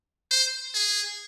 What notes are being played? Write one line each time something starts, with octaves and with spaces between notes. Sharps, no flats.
C5
G#4